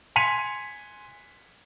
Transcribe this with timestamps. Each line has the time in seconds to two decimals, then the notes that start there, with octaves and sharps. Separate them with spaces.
0.16 G#5 C6 B6 C#7 D#7 F7